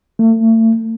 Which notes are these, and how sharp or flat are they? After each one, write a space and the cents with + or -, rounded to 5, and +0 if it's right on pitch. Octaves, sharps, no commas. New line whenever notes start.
A3 +35